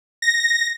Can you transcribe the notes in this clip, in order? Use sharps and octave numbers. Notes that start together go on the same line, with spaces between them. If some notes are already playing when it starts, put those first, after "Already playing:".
A#6